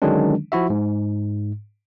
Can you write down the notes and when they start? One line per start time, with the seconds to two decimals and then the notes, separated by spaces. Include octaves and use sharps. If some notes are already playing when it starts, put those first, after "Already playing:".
0.02 D3 D#3 F#3 G#3 C#4 D4
0.52 F3 E4 F#4 E5
0.70 G#2